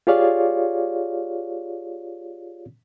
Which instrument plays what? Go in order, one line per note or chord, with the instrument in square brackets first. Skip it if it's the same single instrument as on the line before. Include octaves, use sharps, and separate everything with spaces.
[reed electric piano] F4 G4 G#4 C#5 D5 F5